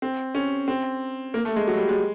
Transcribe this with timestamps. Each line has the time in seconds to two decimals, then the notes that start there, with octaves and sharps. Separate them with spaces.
0.02 C4
0.35 C#4
0.68 C4
1.34 A#3
1.45 A3
1.56 G#3
1.67 F#3
1.77 G3
1.89 G#3